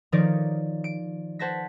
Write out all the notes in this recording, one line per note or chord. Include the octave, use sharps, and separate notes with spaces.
D#3 F3 D#4 A#4 C#5 D5
D7
C5 F#5 A5 G#6 A#6 B6